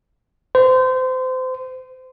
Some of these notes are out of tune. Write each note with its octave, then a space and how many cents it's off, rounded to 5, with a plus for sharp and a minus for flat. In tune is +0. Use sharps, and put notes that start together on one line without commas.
C5 -30